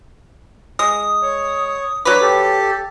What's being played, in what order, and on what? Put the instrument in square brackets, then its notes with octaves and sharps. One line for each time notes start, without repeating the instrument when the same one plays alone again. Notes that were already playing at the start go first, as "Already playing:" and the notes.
[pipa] G#3 [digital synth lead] D#6
[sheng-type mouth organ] C#5
[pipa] F#3 B4 [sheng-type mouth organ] D4 [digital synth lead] D6
[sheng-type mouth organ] G4 A4